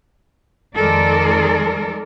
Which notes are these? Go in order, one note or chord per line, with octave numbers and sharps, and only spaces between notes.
F2 D#3 G#3 A4 A#4 D5